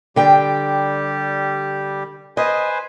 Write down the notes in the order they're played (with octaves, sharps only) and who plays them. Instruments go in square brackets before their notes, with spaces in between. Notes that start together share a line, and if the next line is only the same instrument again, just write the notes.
[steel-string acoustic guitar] D3 G5 [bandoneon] G3 G4
[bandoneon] B4 C5 G#5 [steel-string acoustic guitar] D#5